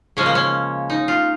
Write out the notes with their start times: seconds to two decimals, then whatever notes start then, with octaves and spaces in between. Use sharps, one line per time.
0.17 C#3 F3 G#3 C#4
0.26 A#3
0.35 C#4
0.90 D#4
1.08 F4